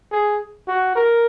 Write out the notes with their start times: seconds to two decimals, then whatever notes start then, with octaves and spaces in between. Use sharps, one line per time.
0.12 G#4
0.68 F#4
0.96 A#4